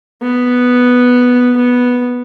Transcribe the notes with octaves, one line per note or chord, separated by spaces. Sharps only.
B3
B3